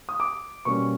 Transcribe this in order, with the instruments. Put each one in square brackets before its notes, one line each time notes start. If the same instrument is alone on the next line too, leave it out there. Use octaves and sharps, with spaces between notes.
[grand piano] D#6
D6
B2 G3 A#3 C#4 C#6